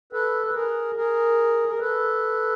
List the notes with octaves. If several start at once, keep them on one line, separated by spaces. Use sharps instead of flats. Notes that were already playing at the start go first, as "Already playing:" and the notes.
A4 B4
B4
G#4 A#4
G#4 A#4
A#4
A4 B4